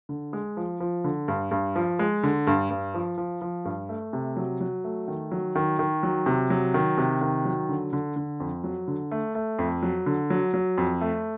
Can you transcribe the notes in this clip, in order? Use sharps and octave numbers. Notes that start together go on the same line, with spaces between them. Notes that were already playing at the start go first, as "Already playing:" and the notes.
D3
G#3
F3
F3
D3
G2
G2
F3
G#3
D3
G2
G2
F3
F3
F3
G2
A3
C3
F#3
F#3
A3
D#3
F#3
D#3
D#3
F#3
C3
F#3
D#3
C3
D#3
F#3
D3
D3
D3
F2
F#3
D3
A3
A3
F2
F#3
D3
F#3
F#3
F2
A3